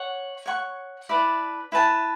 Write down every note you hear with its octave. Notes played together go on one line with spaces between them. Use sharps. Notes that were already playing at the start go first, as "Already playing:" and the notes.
Already playing: C#5 F#5 C#6
C#5 F#5 C#6
E4 B4 D5 A5
E4 B4 D5 A5